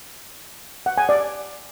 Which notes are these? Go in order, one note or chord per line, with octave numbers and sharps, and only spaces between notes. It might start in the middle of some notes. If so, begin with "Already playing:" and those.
F#5
G#5
D5